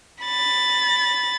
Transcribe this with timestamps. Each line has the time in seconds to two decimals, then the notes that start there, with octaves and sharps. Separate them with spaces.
0.24 B5 A6